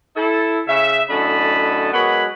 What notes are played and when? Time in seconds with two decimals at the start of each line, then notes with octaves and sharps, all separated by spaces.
0.16 E4 A4
0.68 C#3 E5
1.10 F#2 A2 D3 D#5 A5 B5
1.93 F#3 G#3 B3 A#4 F#5 B5